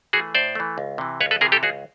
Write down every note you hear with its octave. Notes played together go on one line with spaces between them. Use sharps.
E3 A3 F#4 G#4
A2 C5 D5
E3 A3
C#2
C3 E3
C#2 B4 C#5
A4 B4
C3 E3 G#4 A#4
G4 A4
C#2 F#4 G#4